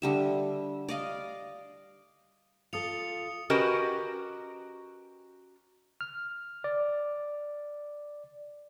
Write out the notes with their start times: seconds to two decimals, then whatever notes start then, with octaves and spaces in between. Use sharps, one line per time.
0.02 D3 G3 E5
0.89 D5 D#5 F5
2.73 F4 A4 D#6 C#7 F7
3.50 C#4 F#4 G4 A#4 B4 D#5
6.01 F6
6.64 D5